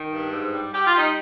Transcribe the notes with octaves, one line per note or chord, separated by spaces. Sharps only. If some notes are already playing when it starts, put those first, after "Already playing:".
Already playing: D#3
G2
G#2
G3
G3 G4
F4
G3 D#4